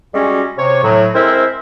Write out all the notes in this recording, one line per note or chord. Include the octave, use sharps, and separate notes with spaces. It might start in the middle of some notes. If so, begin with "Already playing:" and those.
G3 G#3 C#4 F#4
C3 C#5
A2 F#3
G#3 C4 E4 A#4 C5 E5